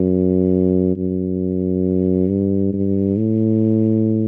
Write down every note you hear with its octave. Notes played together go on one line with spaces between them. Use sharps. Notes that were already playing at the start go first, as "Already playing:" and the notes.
Already playing: F#2
F#2
G2
G2
A2